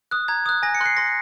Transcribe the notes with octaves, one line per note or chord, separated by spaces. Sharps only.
D#6 F#6
A#5 G#6
D#6 F#6
G#5 A#6
C#7
C6 F#6 C7
C6 A#6